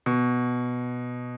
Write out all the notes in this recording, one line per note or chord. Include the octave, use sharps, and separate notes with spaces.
B2